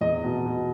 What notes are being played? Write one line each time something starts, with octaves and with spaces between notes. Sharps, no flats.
E2 D#5
B2
B2